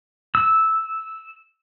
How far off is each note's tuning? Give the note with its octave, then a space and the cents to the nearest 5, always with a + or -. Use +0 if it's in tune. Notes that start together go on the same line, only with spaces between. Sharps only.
E6 -10